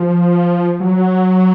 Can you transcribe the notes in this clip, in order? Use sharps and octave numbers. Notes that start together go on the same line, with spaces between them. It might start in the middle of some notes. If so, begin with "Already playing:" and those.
Already playing: F3
F#3